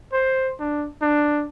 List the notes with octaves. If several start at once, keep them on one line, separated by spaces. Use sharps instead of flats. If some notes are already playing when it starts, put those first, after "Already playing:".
C5
D4
D4